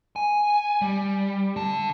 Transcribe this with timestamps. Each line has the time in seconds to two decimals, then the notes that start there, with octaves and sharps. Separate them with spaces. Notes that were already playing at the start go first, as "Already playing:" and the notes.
0.16 G#5
0.82 G3
1.56 D3 A5